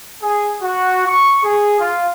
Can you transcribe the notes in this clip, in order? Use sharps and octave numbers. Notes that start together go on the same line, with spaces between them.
G#4
F#4
C#6
G#4
F4